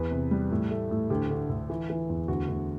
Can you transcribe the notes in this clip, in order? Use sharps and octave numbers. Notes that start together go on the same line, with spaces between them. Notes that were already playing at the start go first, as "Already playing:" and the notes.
Already playing: E2 B4
C3
G3
A2
A3
A2
D2 G4
D3
D2
E3
E3
E2
D2 F#4
D2